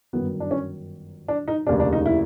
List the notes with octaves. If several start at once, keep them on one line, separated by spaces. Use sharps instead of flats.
G1 F#2 D#3 F#3 B3
D4
C#4
D4
D#4
F1 D#2 C#3 D4
D4
D#4
E4